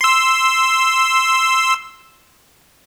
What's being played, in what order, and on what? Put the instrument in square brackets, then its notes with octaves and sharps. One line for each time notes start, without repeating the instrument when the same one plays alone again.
[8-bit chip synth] C6 E6